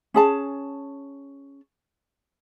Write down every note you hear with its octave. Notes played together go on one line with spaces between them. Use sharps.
C#4 G#4 A5